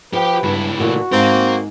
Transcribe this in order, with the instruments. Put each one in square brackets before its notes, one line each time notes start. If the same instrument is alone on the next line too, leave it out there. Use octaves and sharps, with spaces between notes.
[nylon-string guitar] F3 [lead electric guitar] G4 G5 [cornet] B4
[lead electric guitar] C#2 E4 [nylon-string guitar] G2 B3
[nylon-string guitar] A#2 E3 A3 [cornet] F#4
[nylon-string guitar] G#2 [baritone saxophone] C4 [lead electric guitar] A#4 F5